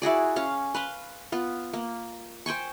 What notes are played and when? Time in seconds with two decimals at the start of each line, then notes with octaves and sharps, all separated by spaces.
0.02 E4 F#4 G#4 D5
0.36 C#4 F5
0.75 B4 F5 C6
1.32 B3 F4
1.73 A#3
2.46 C5 G5 G#5 C#6